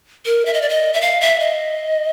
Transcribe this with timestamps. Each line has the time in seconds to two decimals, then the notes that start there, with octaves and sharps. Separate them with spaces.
0.26 A#4
0.46 E5
0.53 D#5
0.62 D5
0.69 D#5
0.94 E5
1.01 F5
1.21 E5
1.40 D#5